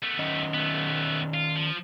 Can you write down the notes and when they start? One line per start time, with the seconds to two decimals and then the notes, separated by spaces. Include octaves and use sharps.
0.03 A3 B3
0.19 D#3 C#4 D#5
0.54 A3 B3
1.34 F4
1.56 F3